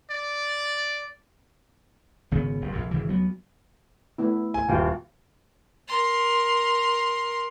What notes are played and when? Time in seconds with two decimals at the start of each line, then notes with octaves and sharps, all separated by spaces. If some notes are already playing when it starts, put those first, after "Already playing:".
0.10 D5
2.31 G#1 C#3 B3
2.61 F#1 G2
2.73 A#1 F2
2.91 G#1 C#3 E3
3.08 D2 F#3 B3
4.18 A3 B3 E4
4.54 G#5
4.69 D#1 F#4 F5 G5
5.88 A#4 C6